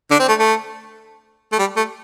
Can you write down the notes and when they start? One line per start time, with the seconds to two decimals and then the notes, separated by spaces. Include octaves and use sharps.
0.11 D3 D4
0.19 C4
0.29 A3
0.39 A3
1.52 A3
1.59 G3
1.76 A3